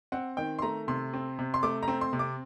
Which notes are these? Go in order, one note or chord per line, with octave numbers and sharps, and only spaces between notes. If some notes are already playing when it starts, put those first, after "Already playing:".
C4 F#5
D#3 G5
C6
A3 A#5
C3 C6
C4
C3
C6
A3 D6
A#5
C4
C6
C3
D6